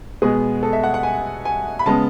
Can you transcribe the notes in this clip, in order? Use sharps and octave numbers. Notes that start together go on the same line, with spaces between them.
B2 G#3 B3 G#4
A4
E5
F#5
F#5
G#5
G#5
B5
C#3 G#3 B3 A5